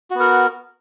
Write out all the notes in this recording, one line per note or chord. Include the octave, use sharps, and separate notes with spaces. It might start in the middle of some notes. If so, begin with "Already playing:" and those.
B3 F#4 A#4